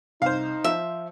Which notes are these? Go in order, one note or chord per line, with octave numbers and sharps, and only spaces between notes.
C2 D#4 C5 F5
F3 E5